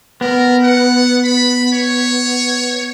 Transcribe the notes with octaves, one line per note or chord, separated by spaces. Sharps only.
B3 A#4
F#5
B5
C#5